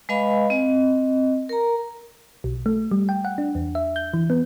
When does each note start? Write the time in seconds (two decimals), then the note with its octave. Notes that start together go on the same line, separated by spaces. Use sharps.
0.09 G#3 B4 D#5 F5 G#5 B5
0.50 C4 D#5
1.49 A#4 A#5
2.44 B1
2.66 A3
2.91 G3
3.09 G5
3.25 F#5
3.38 D4
3.55 E2
3.75 E5
3.96 G6
4.14 E3
4.30 B3